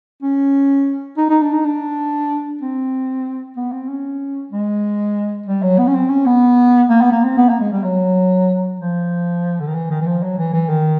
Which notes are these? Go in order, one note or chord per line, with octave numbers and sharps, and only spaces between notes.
C#4
D#4
D#4
D4
D#4
D4
C4
B3
C4
C#4
G#3
G3
F#3
B3
C#4
C4
C#4
B3
A#3
B3
A#3
C4
B3
A#3
G#3
G3
F#3
F3
D3
D#3
E3
D#3
E3
F3
F#3
E3
E3
D#3